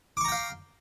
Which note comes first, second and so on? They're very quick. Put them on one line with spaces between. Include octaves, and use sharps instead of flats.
D6 C#6 A#5 G5 F5